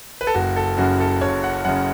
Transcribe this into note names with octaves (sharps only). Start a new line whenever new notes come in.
B4
A4
F#1 F#4
A4
F#2 C#3 F#4
A4
F#1 C#5
F#5
F#2 C#3 F#5